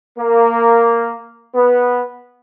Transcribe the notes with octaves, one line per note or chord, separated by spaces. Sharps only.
A#3
B3